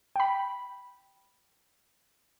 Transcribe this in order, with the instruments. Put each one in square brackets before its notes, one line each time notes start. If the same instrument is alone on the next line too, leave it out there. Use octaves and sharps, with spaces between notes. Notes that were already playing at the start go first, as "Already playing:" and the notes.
[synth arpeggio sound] G5 B5